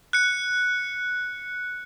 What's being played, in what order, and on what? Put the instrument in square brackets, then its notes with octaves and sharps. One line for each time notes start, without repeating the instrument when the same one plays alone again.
[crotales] F#6 C#7